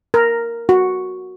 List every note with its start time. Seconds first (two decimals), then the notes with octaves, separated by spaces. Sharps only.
0.14 A#4
0.69 F#4